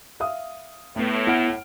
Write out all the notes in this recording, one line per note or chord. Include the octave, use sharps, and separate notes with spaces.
E5 F5 D#6
A2 A3 B3
B3 E4 F#5 F6 D7